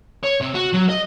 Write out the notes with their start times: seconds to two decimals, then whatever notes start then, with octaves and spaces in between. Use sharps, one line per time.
0.24 C#5
0.42 C3
0.56 F#4
0.74 F#3
0.90 D#5